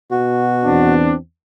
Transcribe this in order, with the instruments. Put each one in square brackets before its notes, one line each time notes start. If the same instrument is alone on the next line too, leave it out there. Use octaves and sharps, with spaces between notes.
[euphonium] B2 [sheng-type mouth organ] F#4
[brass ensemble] E2 C4 D4